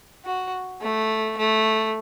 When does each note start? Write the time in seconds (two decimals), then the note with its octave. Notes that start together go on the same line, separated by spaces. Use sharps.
0.25 F#4
0.81 A3
1.37 A3